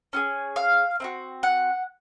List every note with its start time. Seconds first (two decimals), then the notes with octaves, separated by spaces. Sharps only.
0.13 C#4 F4 G#4
0.56 F5
1.00 C4 D#4 F#4
1.43 F#5